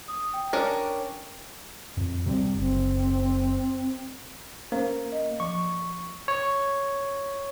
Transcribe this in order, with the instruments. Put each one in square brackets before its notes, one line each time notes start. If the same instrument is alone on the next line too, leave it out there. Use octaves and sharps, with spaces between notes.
[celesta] D#6
G5
[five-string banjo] C#4 D4 A#4
[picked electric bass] F2
C3 G3 C4
[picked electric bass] F#1 [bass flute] C4
[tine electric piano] A#3 [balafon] C#4 C5
[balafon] D#5
[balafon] F3 [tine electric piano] C#6
[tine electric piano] C#5